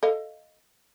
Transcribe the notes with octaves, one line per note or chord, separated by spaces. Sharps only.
A4 D#5 F5